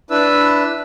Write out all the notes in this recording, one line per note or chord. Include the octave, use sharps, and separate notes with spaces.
D4 E4 B4 E6